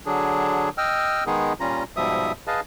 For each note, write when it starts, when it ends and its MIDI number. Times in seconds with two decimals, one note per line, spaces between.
0.06 0.69 50
0.06 0.69 54
0.06 0.69 62
0.06 0.69 68
0.78 1.24 75
0.78 1.24 79
0.78 1.24 88
0.78 1.24 89
1.27 1.53 51
1.27 1.53 56
1.27 1.53 59
1.27 1.53 63
1.27 1.53 68
1.60 1.83 46
1.60 1.83 55
1.60 1.83 61
1.60 1.83 65
1.60 1.83 82
1.96 2.32 44
1.96 2.32 47
1.96 2.32 53
1.96 2.32 55
1.96 2.32 76
1.96 2.32 87
2.47 2.61 68
2.47 2.61 71
2.47 2.61 75
2.47 2.61 77
2.47 2.61 81